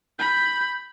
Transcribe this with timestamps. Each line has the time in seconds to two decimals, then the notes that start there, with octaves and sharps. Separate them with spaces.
0.19 B5 G6